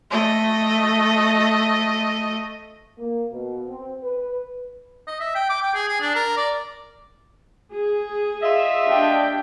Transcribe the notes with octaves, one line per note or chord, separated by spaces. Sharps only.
A3 D#5
A#3
B2
C4
B4
D#5
E5
G5
D6
G5
G#4
G#4
D4
A#4
D5
G#4
F4 D#5 E5
D4 G4 G5